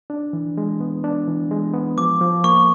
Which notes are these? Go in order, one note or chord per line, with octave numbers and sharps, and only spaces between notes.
D4
E3
G#3
B3
D4
E3
G#3
B3
F3 D6
F3
A#3 C#6